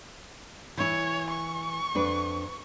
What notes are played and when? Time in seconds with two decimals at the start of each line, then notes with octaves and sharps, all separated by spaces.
0.77 E3 E4 C#5
1.30 C#6
1.95 F2 D4 B4